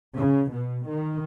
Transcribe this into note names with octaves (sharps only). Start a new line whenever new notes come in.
C#3
B2
D#3